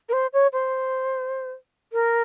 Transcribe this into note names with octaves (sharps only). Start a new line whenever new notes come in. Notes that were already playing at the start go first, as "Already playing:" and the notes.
A#4
C5
C#5
C5
A#4